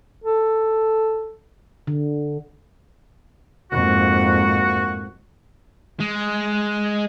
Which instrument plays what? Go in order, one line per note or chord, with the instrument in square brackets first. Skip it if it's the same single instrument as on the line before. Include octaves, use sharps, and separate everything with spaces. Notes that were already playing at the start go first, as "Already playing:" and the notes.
[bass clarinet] A4
[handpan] D3
[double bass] F2 G#2 [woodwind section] A#3 F#4
[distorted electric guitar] G#3